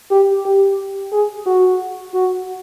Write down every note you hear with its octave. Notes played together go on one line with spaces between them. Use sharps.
G4
G4
G#4
F#4
F#4